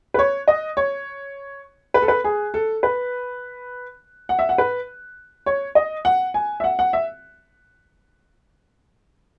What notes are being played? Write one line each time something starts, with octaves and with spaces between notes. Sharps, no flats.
B4
C#5
D#5
C#5
B4
A4
B4
G#4
A4
B4
F#5
E5
F#5
B4
C#5
D#5
F#5
G#5
E5
F#5
F#5
E5